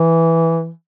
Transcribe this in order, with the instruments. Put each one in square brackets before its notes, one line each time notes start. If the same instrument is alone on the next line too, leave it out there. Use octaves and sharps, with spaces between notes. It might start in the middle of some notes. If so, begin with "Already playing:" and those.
Already playing: [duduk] E3